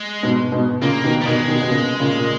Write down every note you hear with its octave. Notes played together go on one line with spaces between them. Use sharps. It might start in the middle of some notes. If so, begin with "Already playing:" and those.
Already playing: G#3
G#2 B2
G#2 B2
A#2 C#3 A#3
B2 D#3
G3
B2 D#3 G#3
B2 D#3
B2
A#2 C#3
A#2 C#3
A#2